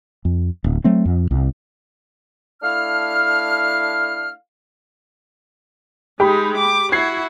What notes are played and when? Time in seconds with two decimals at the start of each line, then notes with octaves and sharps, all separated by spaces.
0.25 F2
0.64 D1
0.84 F#3 A3 C4
1.05 F2
1.31 C2
2.62 A3 D4 E4 F5 F6
6.20 G#3 D#4 G4 B5
6.57 D6
6.92 E4 F#4 G#6 C7